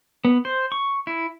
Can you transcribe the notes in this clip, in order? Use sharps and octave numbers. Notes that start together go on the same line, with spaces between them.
B3
C5
C#6
E4